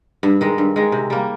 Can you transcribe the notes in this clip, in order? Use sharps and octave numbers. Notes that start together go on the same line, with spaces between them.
G2
D#3 G#3
G2
D#3 G#3
C3
G3 A#3